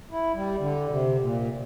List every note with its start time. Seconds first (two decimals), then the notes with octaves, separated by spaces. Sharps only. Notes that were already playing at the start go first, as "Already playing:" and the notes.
0.11 E4
0.35 G3
0.59 D3
0.90 C3
1.20 A#2